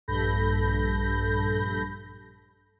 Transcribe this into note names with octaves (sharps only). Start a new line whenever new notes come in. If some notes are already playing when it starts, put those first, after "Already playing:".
A#1 G2 A4 B5 G6 A#6